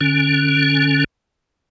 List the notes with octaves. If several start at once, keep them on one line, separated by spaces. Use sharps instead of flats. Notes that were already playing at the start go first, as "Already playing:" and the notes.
D3 C#4